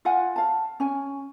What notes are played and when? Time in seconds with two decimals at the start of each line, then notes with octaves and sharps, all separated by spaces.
0.05 F4 F5 F#5 G#5
0.36 F5 A5
0.80 C#4 G#5